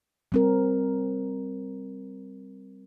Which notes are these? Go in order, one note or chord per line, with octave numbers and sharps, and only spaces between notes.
G3 C4 A#4